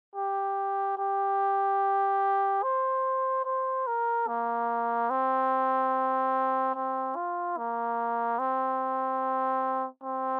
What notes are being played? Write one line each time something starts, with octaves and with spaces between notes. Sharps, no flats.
G4
G4
C5
C5
A#4
A#3
C4
C4
F4
A#3
C4
C4